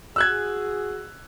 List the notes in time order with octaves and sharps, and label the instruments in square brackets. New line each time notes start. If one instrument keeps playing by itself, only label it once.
[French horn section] F#4 G#4 [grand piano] E6 F#6 G#6